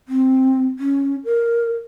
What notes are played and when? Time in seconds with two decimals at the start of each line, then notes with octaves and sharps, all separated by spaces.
0.08 C4
0.79 C#4
1.25 A#4